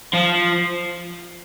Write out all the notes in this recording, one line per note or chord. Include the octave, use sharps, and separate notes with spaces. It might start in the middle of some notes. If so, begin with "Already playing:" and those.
F3